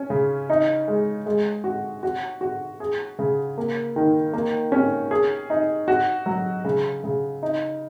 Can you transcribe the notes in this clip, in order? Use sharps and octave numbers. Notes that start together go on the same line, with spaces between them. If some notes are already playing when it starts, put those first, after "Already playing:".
Already playing: C#4
C#3
D#4
G#3
G#3
F#4
F#4
F#4
G#4
C#3
A#3
D#3
A#3
C#4
G#4
D#4
F#4
F#3
C#3
C#3
D#4